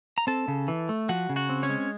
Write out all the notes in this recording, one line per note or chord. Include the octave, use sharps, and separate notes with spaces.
A#5
C4 A4 A5
C#3
E3
A3
F3 F#4 F#5
C#3
F#4 F#5
C4
C#4 C#5
G#3